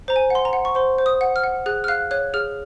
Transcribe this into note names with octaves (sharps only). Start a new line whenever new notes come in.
C5 A#5
G#5
F#5 C6
A#5
F#5
C#6
C5 C6
C5
D#6
F#5
F6
F#5
G#4 F#6
F6
F5 F#6
C#5 F#6
G#4 F6